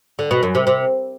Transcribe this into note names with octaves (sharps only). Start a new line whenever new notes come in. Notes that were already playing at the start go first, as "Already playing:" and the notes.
D3
B2
F#2
C3
C3